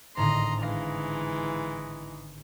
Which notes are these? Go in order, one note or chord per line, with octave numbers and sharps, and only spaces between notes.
G#1 A2 D3 D#5 A#5 C6
E3 G#3 D#4 F5 A#6